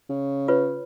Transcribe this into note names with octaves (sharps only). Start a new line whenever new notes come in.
C#3
F4 B4 C#5